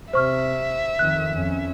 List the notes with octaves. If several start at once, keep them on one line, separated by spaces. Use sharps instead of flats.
C3 C5 E5 C#6 F6
F2 D#3 F#6
F2 C#4